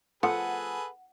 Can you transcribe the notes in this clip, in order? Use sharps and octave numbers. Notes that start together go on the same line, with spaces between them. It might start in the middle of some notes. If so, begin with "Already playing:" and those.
F3 A3 G#4 A4 B4 F#5